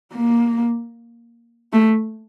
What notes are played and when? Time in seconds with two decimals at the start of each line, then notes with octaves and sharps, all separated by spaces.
0.14 A#3
1.73 A3